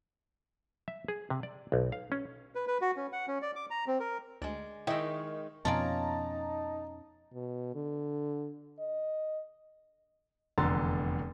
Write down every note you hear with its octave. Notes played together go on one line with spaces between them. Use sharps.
E5
G#4
C3
D5
B1
F5
C#4
B4
B4
F#4
C#4
F#5
C#4
D5
D6
A#5
C4
A#4
D2 G#3 D5
D#3 G#3 E4 C#5 D#5 E5 G5
F2 B2 C#4 D#4 F4 D5 A5 A#5
B2
D3
D#5
F1 E2 D3 A#5 C6 A6